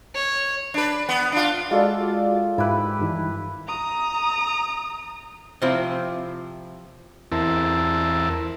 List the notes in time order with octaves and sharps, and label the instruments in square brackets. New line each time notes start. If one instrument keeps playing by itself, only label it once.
[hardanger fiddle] C#5
[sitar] D4 B4
B3
D4 F4
[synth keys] G#3 F#4 D5 [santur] F4 A4
[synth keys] G#2 [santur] E4 G4 B4
[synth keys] G2 D#3 E3
[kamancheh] A#5 D#6
[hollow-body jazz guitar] C3 F3 C4 E4
[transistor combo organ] E2 C4 E4 A#4 A5